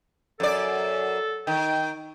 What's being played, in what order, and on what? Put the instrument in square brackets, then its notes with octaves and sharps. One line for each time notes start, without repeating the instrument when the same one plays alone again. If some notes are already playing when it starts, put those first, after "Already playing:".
[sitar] F#2 D5 [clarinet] A4
[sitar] D#3 [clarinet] G5